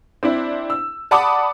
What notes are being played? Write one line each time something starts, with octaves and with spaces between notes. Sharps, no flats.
C4 D4 E4
E6
D5 F#5 A5 B5 D6 D#6